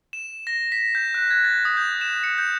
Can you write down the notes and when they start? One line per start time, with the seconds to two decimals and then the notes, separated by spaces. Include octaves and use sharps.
0.13 E7
0.47 A#6
0.72 B6
0.95 G6
1.14 F#6
1.31 G#6
1.45 A6
1.65 D#6
1.77 G6
2.01 E7
2.24 C#7
2.38 G6